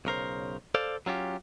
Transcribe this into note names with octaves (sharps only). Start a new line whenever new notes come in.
B1 C#3 A#4 C5
A4 C5 D5 F5
F#3 C#4 F4 G4